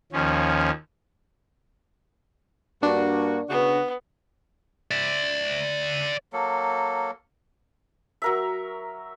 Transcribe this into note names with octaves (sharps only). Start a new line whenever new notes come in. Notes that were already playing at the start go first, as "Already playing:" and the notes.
D#2 F3 C#4
G2 A#3 D4 F#4
C#3 B3 F#4
D5 E5
F#3 A#3 A4
F#3 A#4 E5